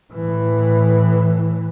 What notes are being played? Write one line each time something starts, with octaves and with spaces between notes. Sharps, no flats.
A2 E3